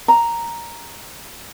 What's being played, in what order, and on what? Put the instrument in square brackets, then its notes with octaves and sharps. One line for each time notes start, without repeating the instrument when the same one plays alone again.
[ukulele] A#5